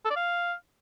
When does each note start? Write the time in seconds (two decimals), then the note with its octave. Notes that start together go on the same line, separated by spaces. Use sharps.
0.05 A4
0.11 D5
0.16 F5